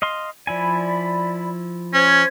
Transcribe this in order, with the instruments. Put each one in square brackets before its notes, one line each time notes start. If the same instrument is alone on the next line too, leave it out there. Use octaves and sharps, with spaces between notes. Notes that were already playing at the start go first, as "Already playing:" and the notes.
[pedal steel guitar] D#5 F5 C6
[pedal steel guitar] F3 E4 G#5 [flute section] D5 B5
[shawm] C#4 [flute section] C5 G#6